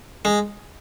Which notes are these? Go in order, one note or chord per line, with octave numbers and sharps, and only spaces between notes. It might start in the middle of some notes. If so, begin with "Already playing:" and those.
G#3